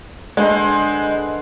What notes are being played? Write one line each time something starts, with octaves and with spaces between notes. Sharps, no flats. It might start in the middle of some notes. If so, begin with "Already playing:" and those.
D3 G#3 B4 C5